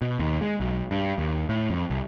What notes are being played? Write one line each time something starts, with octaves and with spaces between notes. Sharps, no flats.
B2
D#2
G#3
B1
G2
D#2
A2
F2
C2